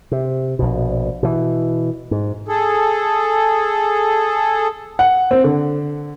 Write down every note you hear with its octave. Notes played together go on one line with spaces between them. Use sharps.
C3
A#1 B2
B2 E3
G#2
G#4 A4
F#5
C4
D3